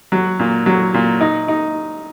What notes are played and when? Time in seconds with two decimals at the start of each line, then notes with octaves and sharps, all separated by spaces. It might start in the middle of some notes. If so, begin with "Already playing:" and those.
0.12 F#3
0.39 A#2
0.66 F#3
0.94 A#2
1.21 D#4
1.48 D#4